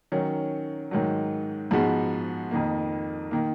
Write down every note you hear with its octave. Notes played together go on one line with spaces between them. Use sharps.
D#3 F#3 C#4
G#2 D#3 F#3
G#2 F3 G#3 B3 F#4
F2 D#3 A#3
D#3 A#3